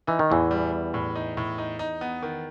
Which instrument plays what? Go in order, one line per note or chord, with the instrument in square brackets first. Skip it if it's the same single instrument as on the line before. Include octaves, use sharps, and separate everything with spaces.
[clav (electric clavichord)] E3 [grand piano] D#4
[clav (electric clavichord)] D#3
[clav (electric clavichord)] E2 E3 [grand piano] A2
[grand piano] G3
G3
A2
D#4
A2
D#4
D#4
B3
D#3